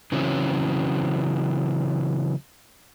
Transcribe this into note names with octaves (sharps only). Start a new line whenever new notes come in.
C#3 E3 F#3 C4 C#4